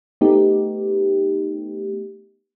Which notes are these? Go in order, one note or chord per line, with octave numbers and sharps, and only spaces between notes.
A3 B3 D#4 G4